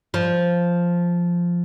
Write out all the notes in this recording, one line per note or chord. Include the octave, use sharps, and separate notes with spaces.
F3